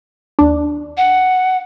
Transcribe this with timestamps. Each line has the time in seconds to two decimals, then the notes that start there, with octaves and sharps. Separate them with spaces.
0.39 D#2 D4
0.97 F#5